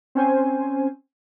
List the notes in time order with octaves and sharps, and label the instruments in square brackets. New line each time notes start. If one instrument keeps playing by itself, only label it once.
[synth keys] C4 C#4 C5 G#5